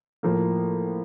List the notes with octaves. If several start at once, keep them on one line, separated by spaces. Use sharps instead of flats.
A2 F3 A#3